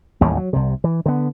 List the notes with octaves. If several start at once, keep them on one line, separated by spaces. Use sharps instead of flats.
A1 D#2 A2 G3
F#3
C2 C3
E3
D3 B3